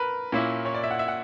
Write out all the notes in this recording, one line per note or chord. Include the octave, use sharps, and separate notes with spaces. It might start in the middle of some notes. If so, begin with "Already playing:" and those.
Already playing: A#4 B4
A#2 A#3 C#4 E4
C#5
D5
E5
F#5
E5
F#5